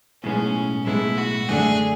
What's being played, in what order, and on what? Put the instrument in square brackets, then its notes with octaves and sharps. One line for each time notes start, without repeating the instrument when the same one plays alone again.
[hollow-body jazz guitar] B1 A2 G#3 B3 [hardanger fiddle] C#4
[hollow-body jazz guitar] B1 A2 G#3 B3 [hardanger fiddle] E4
[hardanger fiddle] F#4
[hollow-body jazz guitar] F#2 D3 A3 D4 [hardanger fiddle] G#4